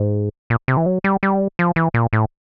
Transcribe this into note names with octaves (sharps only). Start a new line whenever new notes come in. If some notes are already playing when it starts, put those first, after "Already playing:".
Already playing: G#2
A#2
C3
E3
F#3
G3
G3
F3
E3
A#2
A2